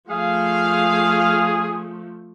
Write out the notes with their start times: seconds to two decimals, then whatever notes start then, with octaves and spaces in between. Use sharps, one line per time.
0.10 F3 A3 G#4 F5